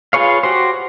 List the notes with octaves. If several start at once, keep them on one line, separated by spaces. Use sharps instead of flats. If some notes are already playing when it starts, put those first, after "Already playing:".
F4 G#4 B4 C#5 F5
F#4 G4 C5